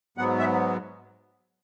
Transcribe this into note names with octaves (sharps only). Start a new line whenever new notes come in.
G#2 F#3 B3 F#5
E5